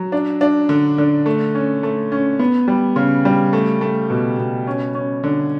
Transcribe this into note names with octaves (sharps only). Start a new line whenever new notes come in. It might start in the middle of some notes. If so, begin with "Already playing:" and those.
Already playing: F#3
D4
D4
D3
D3
A3
C#4
A3
C#4
B3
G3
C#3
G3
A3
A3
B2
B2
C#4
C#4
D3